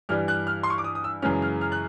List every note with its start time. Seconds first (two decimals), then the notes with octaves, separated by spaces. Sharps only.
0.09 G2 E3 G3 F6
0.28 F#6
0.47 F6
0.63 C6
0.70 C#6
0.78 D6
0.84 D#6
0.95 D#6
1.04 E6
1.22 F#2 C#3 E3 G#3 C#4 F6
1.42 F6
1.61 F6
1.72 F#6